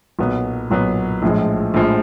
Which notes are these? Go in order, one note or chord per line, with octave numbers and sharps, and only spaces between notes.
B1 A#2 F#3 B3
B1 A#2 F#3 B3
A#1 A2 F3 G#3
A#1 A2 F3 G#3